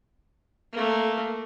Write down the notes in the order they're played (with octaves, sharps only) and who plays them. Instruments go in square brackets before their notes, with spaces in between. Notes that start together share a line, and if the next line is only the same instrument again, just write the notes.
[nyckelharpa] A3 A#3